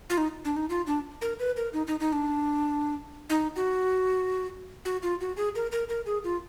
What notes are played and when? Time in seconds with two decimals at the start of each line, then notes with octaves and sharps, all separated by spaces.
0.10 F4
0.18 D#4
0.45 D4
0.57 D#4
0.69 F4
0.87 D4
1.21 A#4
1.39 B4
1.57 A#4
1.73 D#4
1.87 D#4
2.00 D#4
2.13 D4
3.30 D#4
3.56 F#4
4.85 F#4
5.03 F4
5.21 F#4
5.37 G#4
5.55 A#4
5.72 A#4
5.89 A#4
6.06 G#4
6.24 F4